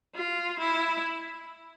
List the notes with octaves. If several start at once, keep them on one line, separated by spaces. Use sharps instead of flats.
F4
E4